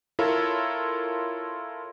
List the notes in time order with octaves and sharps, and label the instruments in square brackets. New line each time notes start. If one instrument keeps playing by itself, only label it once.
[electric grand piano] E4 F4 A4 A#4 C#5